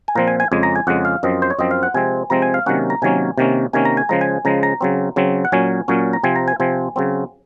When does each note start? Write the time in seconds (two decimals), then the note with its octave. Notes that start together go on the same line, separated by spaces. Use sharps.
0.08 G#5
0.15 A#2 F3 C4 A#5
0.28 G#5
0.40 G#5
0.52 F2 C#3 G#3 G#5
0.63 A#5
0.76 G#5
0.87 F2 C#3 G#3 F#5
1.05 F5
1.23 F#2 F3 C4 D#5
1.42 C5
1.50 C#5
1.59 F#2 F3 C4 D#5
1.71 F5
1.83 F#5
1.94 C3 F3 G#3 C4 G#5
2.30 C3 F3 G#3 C4 A#5
2.42 G#5
2.54 F5
2.66 C3 D#3 F#3 A#3 C#4 F#5
2.90 A#5
3.02 C3 D#3 F#3 A#3 C#4 G#5
3.38 C3 D#3 A#3 C#4
3.73 C3 D#3 A#3 C#4 G#5
3.85 A#5
3.97 G#5
4.09 C#3 F3 G#3 A#5
4.21 G#5
4.45 C#3 F3 G#3 A#5
4.63 A#5
4.81 C#3 F#3 C4
5.16 C#3 F#3 C4
5.45 F#5
5.52 A#2 F#3 C#4 G#5
5.88 A#2 F#3 C#4
6.13 A#5
6.23 C3 F3 C4 G#5
6.36 A#5
6.48 G#5
6.60 C3 F3 C4 G#5
6.96 C#3 F#3 C4